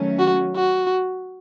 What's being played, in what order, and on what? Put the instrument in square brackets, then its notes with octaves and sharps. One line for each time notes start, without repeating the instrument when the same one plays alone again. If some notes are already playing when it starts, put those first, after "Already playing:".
Already playing: [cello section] D#3 F#3 A3 C#4
[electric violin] F#4
F#4